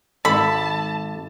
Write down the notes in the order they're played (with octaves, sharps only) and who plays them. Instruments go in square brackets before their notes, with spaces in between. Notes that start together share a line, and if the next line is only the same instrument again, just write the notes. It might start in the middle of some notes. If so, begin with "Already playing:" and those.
[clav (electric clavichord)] G#1 A4 [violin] A5 [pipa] B5